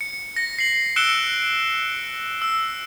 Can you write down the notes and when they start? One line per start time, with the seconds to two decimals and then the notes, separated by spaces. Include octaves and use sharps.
0.01 C#7
0.36 A#6 C#7
0.58 C7 F#7
0.96 E6 F#6 C#7 D7 E7 G7
2.42 E6